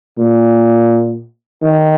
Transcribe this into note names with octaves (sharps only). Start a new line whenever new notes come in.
A#2
D#3